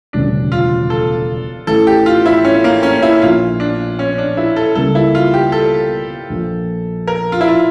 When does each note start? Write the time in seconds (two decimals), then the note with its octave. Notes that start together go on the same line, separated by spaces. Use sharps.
0.13 E1 D2 C#3 G3 C#4 D4
0.52 F4
0.90 A4
1.67 A1 A2 E3 A4
1.87 G4
2.06 F4
2.26 E4
2.45 C#4
2.64 A#3
2.83 C#4
3.02 E4
3.22 A#1 A#2 F3 F4
3.60 D4
3.99 C#4
4.18 D4
4.37 E4
4.56 A4
4.75 C#2 C#3 G3 A#3 A4
4.95 E4
5.15 F4
5.34 G4
5.52 A4
6.30 A#1 A#2 F3
7.08 A#4
7.32 F4
7.41 E4
7.48 F4